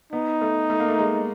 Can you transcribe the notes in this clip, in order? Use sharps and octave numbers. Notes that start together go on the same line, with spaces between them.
B3 D#4
A3
A3
A#3
A3
G#3